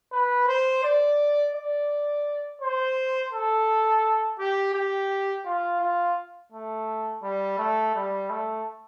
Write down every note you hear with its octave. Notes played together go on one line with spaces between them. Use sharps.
B4
C5
D5
D5
C5
A4
G4
G4
F4
F4
A3
G3
A3
G3
A3